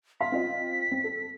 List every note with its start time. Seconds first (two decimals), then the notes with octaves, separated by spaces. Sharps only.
0.20 F5 C6 B6
0.32 C4 F4 D#5
0.92 C4
1.04 A4